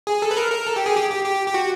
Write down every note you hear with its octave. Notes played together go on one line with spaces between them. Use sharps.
G#4
A4
B4
A#4
A#4
A4
G4
G#4
G4
G4
G4
G4
F#4